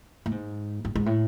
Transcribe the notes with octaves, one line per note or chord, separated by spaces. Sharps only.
A2
G#2
G2
G#2
A2